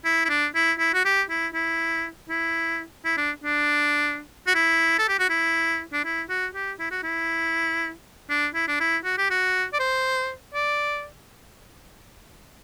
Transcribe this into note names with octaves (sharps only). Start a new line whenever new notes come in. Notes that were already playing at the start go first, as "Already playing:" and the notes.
E4
E4
D4
E4
E4
F#4
G4
E4
E4
E4
E4
D4
D4
F#4
E4
A4
G4
F#4
E4
D4
E4
F#4
G4
E4
F#4
E4
D4
E4
D4
E4
F#4
G4
F#4
D5
C5
D5